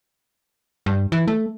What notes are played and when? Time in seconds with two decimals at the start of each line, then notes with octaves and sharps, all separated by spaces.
0.86 G2
1.12 E3
1.28 A3